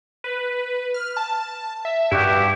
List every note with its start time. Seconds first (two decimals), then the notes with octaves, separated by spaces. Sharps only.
0.24 B4
0.94 F6
1.17 A5
1.85 E5
2.11 G2 E4 F#4 G4